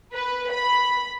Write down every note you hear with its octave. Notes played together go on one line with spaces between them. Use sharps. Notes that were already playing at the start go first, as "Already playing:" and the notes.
B4
B5